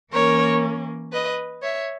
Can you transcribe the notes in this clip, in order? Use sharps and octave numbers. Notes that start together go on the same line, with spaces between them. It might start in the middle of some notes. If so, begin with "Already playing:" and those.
E3 A#3 C#4 A#4 C#5
B4 D#5
C#5 E5